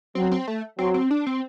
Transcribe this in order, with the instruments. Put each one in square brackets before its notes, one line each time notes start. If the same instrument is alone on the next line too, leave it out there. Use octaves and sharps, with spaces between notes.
[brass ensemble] F#3 [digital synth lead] C4
[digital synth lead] C4
A3
[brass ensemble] F#3 [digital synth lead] C4
[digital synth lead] C4
D4
C4